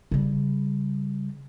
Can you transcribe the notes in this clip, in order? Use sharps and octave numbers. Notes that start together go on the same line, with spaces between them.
C#3 G3